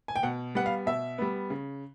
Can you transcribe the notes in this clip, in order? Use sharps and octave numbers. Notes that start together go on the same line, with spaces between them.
G#5
G5
B2 F#5
G3 B3 F#5
F5
B2 E5
G3 B3
C#3